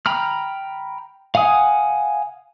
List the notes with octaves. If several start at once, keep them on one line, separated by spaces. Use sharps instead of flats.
G5 A#5 B5 F6
F5 F#5 G#5 D#6